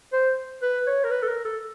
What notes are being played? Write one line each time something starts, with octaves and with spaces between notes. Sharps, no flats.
C5
B4
C#5
A#4
B4
A4
A#4
A4